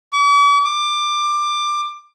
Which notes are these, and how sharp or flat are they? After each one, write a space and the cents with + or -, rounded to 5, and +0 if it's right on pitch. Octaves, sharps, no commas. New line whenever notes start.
D6 -45
D6 +20